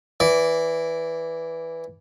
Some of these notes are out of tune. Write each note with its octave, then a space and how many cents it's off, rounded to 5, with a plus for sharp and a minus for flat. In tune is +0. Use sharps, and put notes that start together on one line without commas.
E3 +0 D5 -15